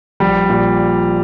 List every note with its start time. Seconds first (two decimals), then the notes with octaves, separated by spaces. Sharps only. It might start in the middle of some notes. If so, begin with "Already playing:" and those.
0.20 A#1 G3
0.50 A#2